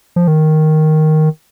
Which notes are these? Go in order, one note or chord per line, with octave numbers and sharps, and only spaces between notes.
F3
D#3